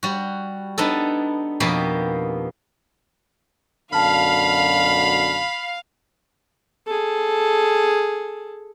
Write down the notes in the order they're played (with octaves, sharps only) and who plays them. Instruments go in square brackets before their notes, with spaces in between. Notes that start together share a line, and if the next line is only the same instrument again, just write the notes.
[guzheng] G3 F#4
B3 D4 D#4 A4
F2 B2 A#3 B3 G4
[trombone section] F#2 B2 D3 [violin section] F5 [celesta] A5 F6 [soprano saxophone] B5
[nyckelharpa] G#4 A4